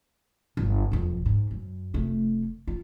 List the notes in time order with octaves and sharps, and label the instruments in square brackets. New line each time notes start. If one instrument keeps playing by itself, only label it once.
[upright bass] G1
E1 F2
G#2
F#2
F1 A3
F4